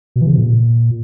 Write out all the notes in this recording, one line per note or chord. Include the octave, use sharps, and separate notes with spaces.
B2
E3
C#3
C3
A#2